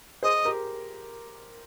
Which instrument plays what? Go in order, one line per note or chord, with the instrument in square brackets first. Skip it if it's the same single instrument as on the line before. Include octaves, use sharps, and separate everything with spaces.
[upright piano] G#4 C5 [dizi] D#5
[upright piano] G4 A#4